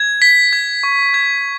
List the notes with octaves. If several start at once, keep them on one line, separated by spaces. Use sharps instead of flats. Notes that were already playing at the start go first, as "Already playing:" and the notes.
Already playing: G#6
B6
G#6
C#6
G#6